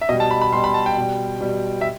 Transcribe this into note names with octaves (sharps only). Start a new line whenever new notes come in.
E5
B2 G3 D#5
A5
B5
B5
B2 G3 C6
B5
A5
G5
B2 G3
B2 G3
E5